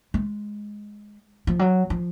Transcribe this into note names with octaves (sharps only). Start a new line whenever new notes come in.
G#3
F3
F#3
F3